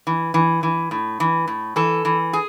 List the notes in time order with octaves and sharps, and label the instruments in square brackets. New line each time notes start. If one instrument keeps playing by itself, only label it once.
[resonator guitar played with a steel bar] E3
E3
E3
A2
E3
A2
E3 A4
E3
G#4